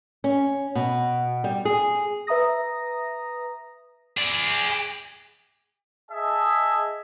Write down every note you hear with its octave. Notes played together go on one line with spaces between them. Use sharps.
C#4
B2
G3
G#4
B4 E5 A#5 D#6 A#6
G#4 D5
G#4 D#5 E5 A5